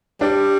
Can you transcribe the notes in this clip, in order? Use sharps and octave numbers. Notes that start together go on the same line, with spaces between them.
G3 D4